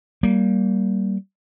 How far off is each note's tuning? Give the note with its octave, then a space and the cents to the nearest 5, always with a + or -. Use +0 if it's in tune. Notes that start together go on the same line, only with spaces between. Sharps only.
G3 -20 A#3 +0